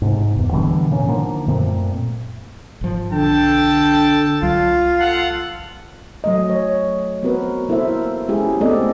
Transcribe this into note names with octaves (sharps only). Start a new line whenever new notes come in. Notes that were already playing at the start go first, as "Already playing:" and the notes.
G#2 C3
G1 E2
B2 D3 E3 G3
A2 A#3 C#4
D3 D#3 F3 A#3
F#2 A#2 A3 C4
G#1 F3
B1 D3 A4 G5 A5
C2 F#3 F4
A4 F5 F#5
F#3 A3 D#5
C#5
B3 C4 F#4 A#4 B4
A#3 E4 A4 A#4 C5 E5
G#3 C#4 E4 G4 G#4
A3 B3 C4 A4 D5 D#5